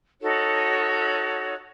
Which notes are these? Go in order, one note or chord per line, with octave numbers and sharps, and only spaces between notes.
D#4 F#4 A4 C#5